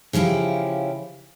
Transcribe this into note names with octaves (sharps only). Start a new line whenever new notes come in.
C#3 F3 C#4 E4 G4